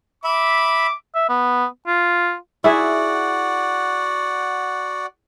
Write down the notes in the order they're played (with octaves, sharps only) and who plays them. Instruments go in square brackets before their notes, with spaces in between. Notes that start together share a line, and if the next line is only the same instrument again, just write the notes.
[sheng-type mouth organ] E5 B5 [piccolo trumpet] D6
[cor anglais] E5
B3
F4
[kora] E4 G#4 E5 [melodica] F#4 D5 F#5